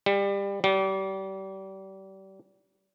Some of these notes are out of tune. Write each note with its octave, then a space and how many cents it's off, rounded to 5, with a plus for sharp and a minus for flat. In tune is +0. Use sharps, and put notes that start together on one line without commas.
G3 +25
G3 -30